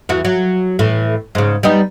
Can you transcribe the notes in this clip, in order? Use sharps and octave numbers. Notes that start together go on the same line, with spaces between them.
E2 E3 F#4
F#3
A2 E3
G#2 C#3
G3 B3 D#4